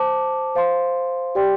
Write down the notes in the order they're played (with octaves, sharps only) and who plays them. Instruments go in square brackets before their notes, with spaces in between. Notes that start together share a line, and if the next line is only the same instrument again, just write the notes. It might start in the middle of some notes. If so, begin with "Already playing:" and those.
Already playing: [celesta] C5 A5 D6
C5 F5 C6
G4 D5 G5 C6